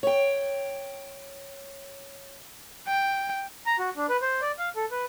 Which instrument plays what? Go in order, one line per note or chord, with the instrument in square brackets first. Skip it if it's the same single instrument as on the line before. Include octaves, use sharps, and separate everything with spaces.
[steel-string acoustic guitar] C#5 G5
[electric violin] G5
[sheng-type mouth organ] A#5
F#4
D4
B4
C5
D5
F5
A4
B4